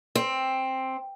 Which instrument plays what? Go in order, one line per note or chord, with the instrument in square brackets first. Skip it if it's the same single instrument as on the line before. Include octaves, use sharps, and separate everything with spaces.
[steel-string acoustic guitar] C4